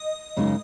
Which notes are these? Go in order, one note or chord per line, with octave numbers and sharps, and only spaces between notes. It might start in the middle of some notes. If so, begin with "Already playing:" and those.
Already playing: D#5
F#2 C#3 G#3 D#4